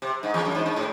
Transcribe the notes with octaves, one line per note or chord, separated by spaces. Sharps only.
C3
G#2
E2
F#2
G#2
G#2
A2